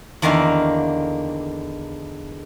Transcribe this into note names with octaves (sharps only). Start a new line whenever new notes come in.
E2 D3 D#3 A#3 E5 F5